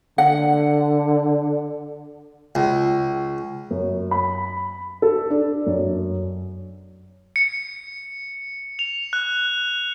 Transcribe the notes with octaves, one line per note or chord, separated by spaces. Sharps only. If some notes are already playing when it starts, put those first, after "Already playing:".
D3 F#5
C#2
F#2
B5
A4
D4
F#2
C#7
F7
F#6